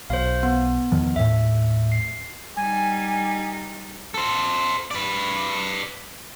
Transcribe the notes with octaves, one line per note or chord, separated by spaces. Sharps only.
B1 C5 F5
B3
E2 D#3 F3
D#2 A2 E5
C7
G3 D#4 G#5
A4 C5
B4 D5